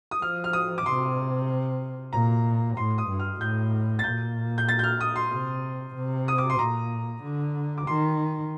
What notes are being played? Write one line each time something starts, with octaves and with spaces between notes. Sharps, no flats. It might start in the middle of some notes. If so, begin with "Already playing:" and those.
D#6
F3 F6
F6
D#6
D6
C3 C6
A#2 A#5
A2 C6
D#6
G2
F6
A2 G6
A6
A#2 G6
G6
A6
G6
F6
D#6
C6
C3
C3
D#6
D6
C6
A#2 A#5
D3
D6
D#3 C6